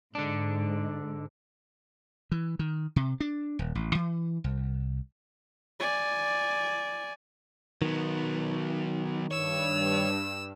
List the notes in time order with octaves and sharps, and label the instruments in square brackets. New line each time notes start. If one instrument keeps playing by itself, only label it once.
[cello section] G#2 [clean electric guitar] D3 D4
[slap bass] E3
D#3
C3
D4
D#1
A1
E3
C2
[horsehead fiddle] D5 G#5
[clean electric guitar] D#3 [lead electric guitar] F#3 B3
[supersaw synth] G2 [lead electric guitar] C#5 [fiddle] E6